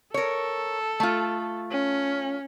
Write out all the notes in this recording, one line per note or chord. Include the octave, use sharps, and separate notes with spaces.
A4 A#4 C#5
A3 F4
C#4